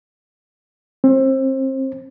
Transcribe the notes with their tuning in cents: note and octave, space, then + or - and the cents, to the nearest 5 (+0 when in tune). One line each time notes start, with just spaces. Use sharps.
C4 +30